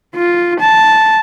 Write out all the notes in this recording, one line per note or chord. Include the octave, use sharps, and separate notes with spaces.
F4
A5